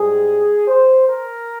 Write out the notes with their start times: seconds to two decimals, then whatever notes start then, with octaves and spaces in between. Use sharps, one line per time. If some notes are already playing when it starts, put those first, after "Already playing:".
Already playing: G#2 G3 G#4
0.67 C5
1.08 A#4